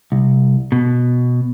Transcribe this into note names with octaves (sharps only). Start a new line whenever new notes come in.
C2
B2